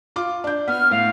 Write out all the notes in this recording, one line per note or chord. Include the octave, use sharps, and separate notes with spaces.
F4 D6
D4 G6
B3 F6
A2 F5